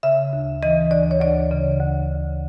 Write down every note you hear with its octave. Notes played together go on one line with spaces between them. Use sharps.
C#3 E5
D2
E3 D#5
D2 D5
C#5
D2 D5
C#3
D2